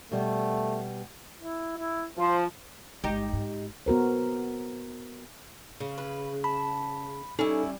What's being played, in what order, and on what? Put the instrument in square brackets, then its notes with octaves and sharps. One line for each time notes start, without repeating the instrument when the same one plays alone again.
[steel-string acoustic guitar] B2 G3 B3 [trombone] A3
[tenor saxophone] E4
E4
[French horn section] F3 [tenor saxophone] C5
[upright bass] G1 G#3 [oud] D#4 G4
[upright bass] G#2
[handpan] B3 F#4 A#4 C5
[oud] C#3
[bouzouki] B4
[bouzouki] A5 [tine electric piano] B5
[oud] G3 [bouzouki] C#4 E4 [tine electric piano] D#4 A4